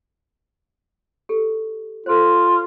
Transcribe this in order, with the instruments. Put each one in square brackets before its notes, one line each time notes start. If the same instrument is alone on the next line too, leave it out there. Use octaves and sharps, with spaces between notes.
[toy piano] G4 A4
[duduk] F4 [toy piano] A4 C5